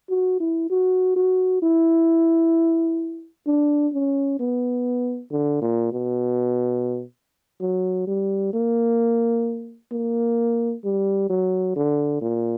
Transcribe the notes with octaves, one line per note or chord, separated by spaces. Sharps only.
F#4
E4
F#4
F#4
E4
D4
C#4
B3
D3
A#2
B2
F#3
G3
A#3
A#3
G3
F#3
D3
A#2